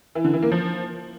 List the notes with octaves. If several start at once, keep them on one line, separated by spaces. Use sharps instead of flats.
E3
D3
E3
A#3
F3